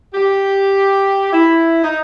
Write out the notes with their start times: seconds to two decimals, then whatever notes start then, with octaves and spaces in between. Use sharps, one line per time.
0.14 G4
1.32 E4
1.84 D#4